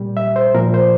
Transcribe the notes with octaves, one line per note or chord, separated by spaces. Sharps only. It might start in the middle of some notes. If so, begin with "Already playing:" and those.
Already playing: A#2 G3
E5
C5
A#2 F3 A#4
C5